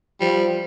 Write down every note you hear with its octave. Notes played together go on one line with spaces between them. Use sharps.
F3 G3